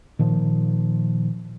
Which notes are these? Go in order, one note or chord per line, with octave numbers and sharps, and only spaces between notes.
A#2 D#3 F3